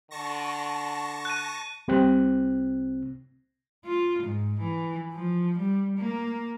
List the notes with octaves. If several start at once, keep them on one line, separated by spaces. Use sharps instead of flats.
D3 A5 C#6 A#6
F#6 D#7
C2 C3 C4 F#6
F4
G#2
E3
F3
G3
A#3